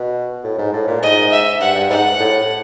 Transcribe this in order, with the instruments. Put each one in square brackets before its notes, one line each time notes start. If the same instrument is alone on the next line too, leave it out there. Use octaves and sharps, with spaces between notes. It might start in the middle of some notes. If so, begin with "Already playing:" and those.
Already playing: [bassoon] B2
A2
G#2
A2
A#2
[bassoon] G#2 [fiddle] D#5
[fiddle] E5
[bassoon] G2 [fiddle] F#5
[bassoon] G2
[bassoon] G#2 [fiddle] F#5
[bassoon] A2